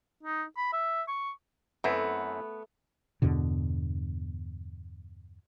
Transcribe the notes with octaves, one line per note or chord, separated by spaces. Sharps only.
D#4
B5
E5
C#6
F#2 A3 B3 C4 E4
E2 G2 B2 D3